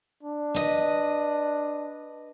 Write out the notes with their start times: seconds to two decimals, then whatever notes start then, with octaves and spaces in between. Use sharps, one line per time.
0.23 D4
0.54 B4 D#5